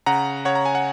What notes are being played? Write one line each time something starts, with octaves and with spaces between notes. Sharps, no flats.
C#3 F#5 A#5
C#3 C#5 F#5
A#5
G#5
F#5